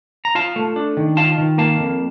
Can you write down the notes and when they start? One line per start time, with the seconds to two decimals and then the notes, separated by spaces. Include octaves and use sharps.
0.25 A#5
0.35 F4 F5 A5
0.56 A3
0.76 D4
0.97 D#3
1.17 F4 F5 A5
1.38 D#3
1.58 A#3 F5 A5
1.79 F2